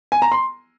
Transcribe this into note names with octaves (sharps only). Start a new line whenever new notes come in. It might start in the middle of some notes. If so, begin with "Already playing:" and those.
G#5
A#5
C6